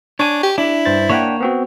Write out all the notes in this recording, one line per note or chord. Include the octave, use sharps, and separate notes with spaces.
D4 C#5 G#5
G4
D4 E4
G2 C5 A6
A#3 D4 C#5 F#5 G5
B3 C4 F#4